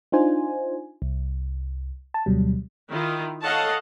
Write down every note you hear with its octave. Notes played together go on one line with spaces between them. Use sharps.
D4 D#4 F4 C5 G#5
C2
A5
D2 B2 F#3 G3
D#3 E4 F4
A4 C#5 D#5 F5 F#5 A5